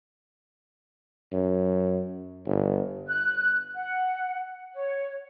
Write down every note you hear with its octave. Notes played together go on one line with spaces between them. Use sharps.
F#2
G1
F#6
F#5
C#5